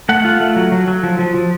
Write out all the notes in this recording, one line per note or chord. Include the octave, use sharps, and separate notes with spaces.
A3 F#5
F4
A3
F#3
F#3
F#3
F3
F3
F3